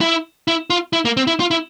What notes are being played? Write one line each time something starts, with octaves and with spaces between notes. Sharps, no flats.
E4
E4
F4
E4
A#3
C4
E4
F4
E4